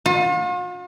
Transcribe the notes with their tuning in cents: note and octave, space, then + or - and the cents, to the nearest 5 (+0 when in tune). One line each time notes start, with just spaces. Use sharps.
F4 +45